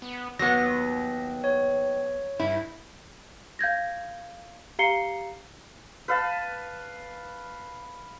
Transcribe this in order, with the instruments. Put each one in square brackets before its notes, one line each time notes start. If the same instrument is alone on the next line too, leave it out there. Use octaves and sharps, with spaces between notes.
[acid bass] B3
[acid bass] D#2 [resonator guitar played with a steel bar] F#3 B3 [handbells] A#6
[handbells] C#5
[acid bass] G2 [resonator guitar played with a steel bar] E4
[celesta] F5 G6 G#6 A#6
G4 F5 A#5 C7 C#7 G7
[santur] B4 F5 A5